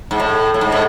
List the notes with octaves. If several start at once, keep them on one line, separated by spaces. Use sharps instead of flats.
G#2
A2
A2
G#2
A2